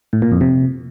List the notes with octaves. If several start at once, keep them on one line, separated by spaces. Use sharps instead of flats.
A2
A#2
F2
C3